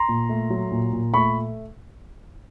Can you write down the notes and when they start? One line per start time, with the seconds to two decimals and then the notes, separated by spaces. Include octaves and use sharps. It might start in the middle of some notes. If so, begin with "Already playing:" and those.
Already playing: A#5 C6
0.08 A#2
0.29 A3
0.50 F#3
0.72 A#2
0.93 A#2
1.14 A3 B5 C#6